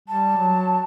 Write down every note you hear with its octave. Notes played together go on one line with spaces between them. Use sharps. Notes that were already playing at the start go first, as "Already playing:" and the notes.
G3 A5
F#3